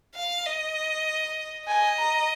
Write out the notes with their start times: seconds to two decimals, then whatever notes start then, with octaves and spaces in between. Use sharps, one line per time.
0.15 F5
0.45 D#5
1.68 D#5 G#5
1.98 A#5